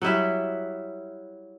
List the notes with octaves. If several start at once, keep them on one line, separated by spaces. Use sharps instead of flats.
F#3 G3 E4 E5